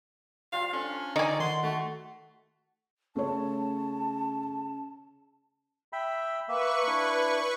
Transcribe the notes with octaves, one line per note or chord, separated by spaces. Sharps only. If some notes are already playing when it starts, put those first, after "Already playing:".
G3 F4 C5 F5
C#4 D4 A4
D3 D#4 D5 G#5 C#6
D#3 F#5 C6
A3 F#4
C#3 A3 C#5 A5
E5 G5 B5
A#3 B4 E5 C#6
D4 E4